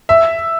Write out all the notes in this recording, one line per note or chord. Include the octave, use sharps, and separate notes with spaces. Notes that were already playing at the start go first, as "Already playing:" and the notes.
E5